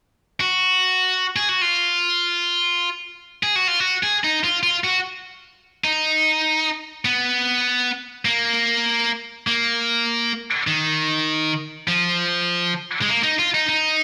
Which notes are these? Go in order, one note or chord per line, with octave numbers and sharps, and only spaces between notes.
F#4
G#4
F#4
F4
G#4
F#4
F4
F#4
G#4
D#4
F4
F4
F#4
D#4
B3
A#3
A#3
D#3
F3
G#3
A#3
D#4
F4
D#4
D#4